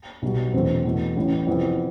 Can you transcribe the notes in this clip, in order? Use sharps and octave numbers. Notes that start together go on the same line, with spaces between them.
B1 B2 G3
E1 E2 B2 A3 C4
E2 B2 A3
A1 A2 E3
F2 C3 E3 B3 E4